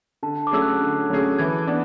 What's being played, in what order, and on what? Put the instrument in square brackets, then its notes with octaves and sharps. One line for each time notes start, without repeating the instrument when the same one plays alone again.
[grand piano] D3 [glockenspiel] A5
[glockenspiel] D6
[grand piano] F#3 A3 C#4 G#4 [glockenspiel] E6
[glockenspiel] F#6
[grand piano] D3
F#3 A3 C#4 G#4
[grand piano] E3 [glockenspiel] G#6
[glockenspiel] G#6
[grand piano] B3 D4